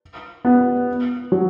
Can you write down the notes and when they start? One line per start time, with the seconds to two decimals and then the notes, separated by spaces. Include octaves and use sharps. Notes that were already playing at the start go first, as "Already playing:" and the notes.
0.45 B3
1.32 F#3